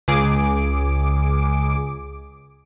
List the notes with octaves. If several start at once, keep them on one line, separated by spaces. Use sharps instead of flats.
C#2 G#4 D6 D7